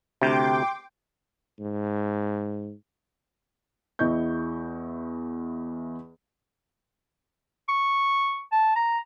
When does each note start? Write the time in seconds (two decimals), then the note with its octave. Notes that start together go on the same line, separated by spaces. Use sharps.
0.21 D2 C3 G5 C6 D6
1.60 G#2
3.99 E2 E4 D#5 C#6 G6
7.69 C#6
8.52 A5
8.76 A#5